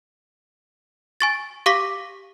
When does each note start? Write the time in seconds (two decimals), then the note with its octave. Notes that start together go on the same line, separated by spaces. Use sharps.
1.21 G#5 C#6 A6
1.66 G4 F5 C#6 D6 A#6 B6